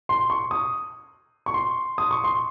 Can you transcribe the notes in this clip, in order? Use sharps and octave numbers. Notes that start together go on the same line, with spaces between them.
C6
C#6
D#6
C#6
C6
D#6
C#6
C6